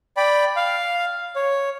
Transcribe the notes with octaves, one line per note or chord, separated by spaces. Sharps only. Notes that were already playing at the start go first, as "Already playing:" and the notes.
D5 G5 B5
F5
C#5